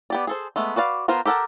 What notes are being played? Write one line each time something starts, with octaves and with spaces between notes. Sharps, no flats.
B3 G4 D5
G#4 A4 C5
G#3 A3 B3
F#4 B4 D5 F5
B3 F4 A#4 C5
G4 A4 A#4 F#5 A5